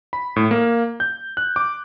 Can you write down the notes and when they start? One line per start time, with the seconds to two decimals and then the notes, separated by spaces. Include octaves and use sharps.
0.13 B5
0.36 A2
0.51 A#3
1.00 G6
1.37 F#6
1.56 D6